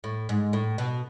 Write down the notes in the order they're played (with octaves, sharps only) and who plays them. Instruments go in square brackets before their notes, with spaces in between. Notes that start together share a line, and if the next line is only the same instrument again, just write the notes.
[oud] A2
G#2
A2
B2